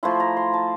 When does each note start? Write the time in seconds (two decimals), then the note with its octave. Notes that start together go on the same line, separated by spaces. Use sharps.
0.03 F3 A3 E4 C6
0.20 A#5
0.37 C6
0.54 A5